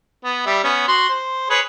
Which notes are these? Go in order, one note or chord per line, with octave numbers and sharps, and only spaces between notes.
B3
G3 E5
B3 C#4
F#4 C6
C5
G#4 B4 C#5